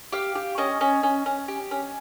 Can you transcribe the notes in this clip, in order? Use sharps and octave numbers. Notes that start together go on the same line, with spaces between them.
G4 F5
G4
C#4 D#5
C#4
C#4
C#4
G4
C#4